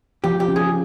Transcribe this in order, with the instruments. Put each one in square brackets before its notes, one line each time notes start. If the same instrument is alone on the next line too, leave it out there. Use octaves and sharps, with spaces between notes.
[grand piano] F3 [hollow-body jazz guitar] G4
[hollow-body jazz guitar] G4
[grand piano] C#3
[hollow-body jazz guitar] G#4